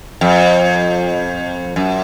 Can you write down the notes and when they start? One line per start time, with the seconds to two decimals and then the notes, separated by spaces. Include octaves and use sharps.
0.21 F2
1.76 F#2